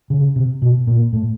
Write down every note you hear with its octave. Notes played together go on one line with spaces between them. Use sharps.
C#3
C3
B2
A#2
A2